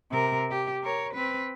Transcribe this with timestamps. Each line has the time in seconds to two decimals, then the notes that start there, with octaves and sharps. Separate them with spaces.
0.11 C3 A#4
0.50 G4
0.83 A#4 C#5
1.14 C4 B4